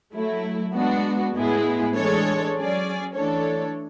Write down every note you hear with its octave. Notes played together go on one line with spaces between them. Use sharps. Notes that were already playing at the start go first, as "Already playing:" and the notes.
F#3 A3 E4
G#3 B3 D4 F#4
A2 G#3 B3 E4 G#4
E3 G#3 D4 A4 C#5
F#3 C#4 G#4 D5
E3 A3 D4 A4 C#5